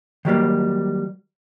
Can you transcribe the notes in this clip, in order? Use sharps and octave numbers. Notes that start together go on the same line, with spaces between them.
D#3 F#3 G3 A#3